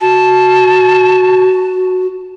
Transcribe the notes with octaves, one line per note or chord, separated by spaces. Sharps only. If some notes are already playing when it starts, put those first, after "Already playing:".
F#4 A5